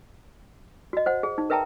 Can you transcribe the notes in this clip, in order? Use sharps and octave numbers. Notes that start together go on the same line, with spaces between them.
F#4 D#5
C5 F#5
G#4
D#4
A#4 B4 E5 G5 A5 A#5